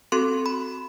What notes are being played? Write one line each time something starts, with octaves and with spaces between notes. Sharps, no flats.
C4 F#4 A4 C6
B5